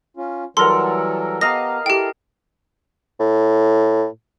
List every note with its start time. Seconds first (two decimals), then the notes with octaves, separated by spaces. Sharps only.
0.17 C#4 F4
0.57 E3 F#3 G3 A4 A#4 F#5 C6
1.41 B3 G4 D#5 F5 A#5 A#6
1.86 E4 G4 A4 G5
3.20 A2